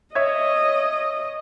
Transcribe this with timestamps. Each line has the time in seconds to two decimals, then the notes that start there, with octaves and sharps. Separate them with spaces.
0.15 C#5 D#5 E5 G#6